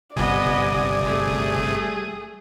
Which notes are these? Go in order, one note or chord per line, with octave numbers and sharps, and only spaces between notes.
G1 C3 G3 B3 D5 D#5 G#5 D#6
A3 G#4